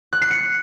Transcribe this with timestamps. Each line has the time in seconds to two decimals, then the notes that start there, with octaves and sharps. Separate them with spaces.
0.13 F#6
0.22 C7
0.31 C#7